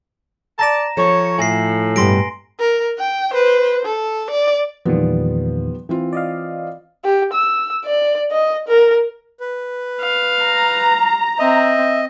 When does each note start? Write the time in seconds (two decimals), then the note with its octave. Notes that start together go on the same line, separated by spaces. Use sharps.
0.59 D5 A5 A#5 A#6 E7
0.97 F3 A4 C#5
1.39 A2 G#5 A#6 C7
1.96 G2 B2 G3 C6 A#6 D7
2.60 A#4
2.99 G5
3.34 B4 C5
3.85 A4
4.31 D5
4.85 E2 A#2 D#3 F3 G3 B3
5.89 E3 C4 F4
6.13 D5 D#5 F5
7.05 G4
7.33 E6
7.85 D5
8.31 D#5
8.68 A#4
9.40 B4
10.01 F5
10.43 A#5
11.39 C4 D#5 E5